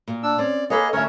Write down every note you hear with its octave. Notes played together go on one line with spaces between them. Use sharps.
A#2
D4 E6
C4 C#4 D5
A#3 G#4 A4 B4 C#5 D#5
D2 C#4 A#4 C#5 E5